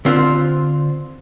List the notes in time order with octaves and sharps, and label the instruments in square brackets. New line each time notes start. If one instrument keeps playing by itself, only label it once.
[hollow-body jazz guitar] D3 C4 F4 C5